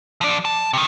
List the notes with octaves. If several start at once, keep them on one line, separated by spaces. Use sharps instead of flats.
F3 D5
A5
C3 D#3